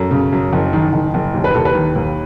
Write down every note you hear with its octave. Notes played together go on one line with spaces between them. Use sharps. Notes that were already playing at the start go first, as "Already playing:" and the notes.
Already playing: F#2 A4
C#3
F#2
F#1
D#3
F#1
F#1
D#2
B4
D#2 A4
B4
D#3
D#2